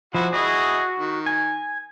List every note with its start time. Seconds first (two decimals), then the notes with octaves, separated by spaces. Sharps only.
0.15 F3 E4 F#4
0.33 E4 F#4 G#4 D#5
0.99 D#3
1.26 G#5